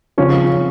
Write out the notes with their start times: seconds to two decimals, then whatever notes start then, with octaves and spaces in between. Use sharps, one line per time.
0.18 C#3 F3 C#4